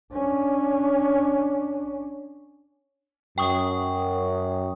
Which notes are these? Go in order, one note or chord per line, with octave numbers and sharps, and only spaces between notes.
C#4 D4
F#2 G5 C#6 D#6